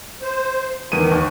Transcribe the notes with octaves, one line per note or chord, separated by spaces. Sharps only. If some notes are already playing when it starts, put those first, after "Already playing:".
C5
E2 D#3 D#7
D#2